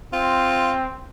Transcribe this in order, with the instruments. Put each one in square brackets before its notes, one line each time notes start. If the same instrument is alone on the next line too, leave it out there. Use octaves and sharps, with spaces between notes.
[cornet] C4 [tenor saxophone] F4